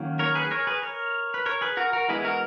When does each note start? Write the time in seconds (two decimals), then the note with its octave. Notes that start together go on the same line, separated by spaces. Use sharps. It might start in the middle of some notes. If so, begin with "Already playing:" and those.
Already playing: D#3 F#3 A#3 C#4
0.19 A#4 C#5
0.35 G#4 B4
0.51 A#4 C#5
0.67 G#4 B4
0.83 A#4 C#5
1.34 B4
1.46 A#4 C#5
1.61 G#4 B4
1.77 F#4 A#4
1.93 F#4 A#4
2.09 E3 G#3 B3 E4 G#4
2.24 F#4 A#4